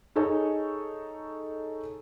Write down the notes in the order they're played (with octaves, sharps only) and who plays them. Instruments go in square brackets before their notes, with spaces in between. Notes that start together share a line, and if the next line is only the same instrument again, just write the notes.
[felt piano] D#4 G#4 A4 C#5 D#5